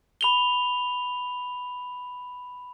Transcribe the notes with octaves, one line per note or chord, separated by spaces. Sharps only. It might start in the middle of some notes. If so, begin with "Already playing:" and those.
B5 F7 G7